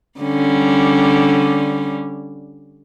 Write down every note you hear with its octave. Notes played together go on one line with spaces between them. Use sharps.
D3 G3 C#4